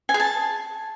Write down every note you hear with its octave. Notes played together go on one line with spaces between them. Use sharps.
G#5
G#4
A5